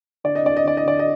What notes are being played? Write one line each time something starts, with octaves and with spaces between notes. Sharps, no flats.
D3 D5
D#5
D2 D5
D#5
D3 D5
D#5
D3 D5
D#5